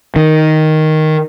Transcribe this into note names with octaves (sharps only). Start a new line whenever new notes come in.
D#3